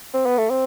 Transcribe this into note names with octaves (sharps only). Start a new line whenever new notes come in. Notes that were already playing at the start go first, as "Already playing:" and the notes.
C4
B3
A3
C4